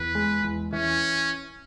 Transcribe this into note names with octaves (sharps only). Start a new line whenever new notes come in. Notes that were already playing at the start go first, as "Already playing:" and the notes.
Already playing: E2 B4
G#3
E2
E3 C#4